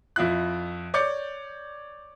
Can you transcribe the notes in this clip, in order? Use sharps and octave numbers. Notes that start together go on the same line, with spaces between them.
F2 E4 F4 F#6
C#5 D5 D6 G6 A6 C#7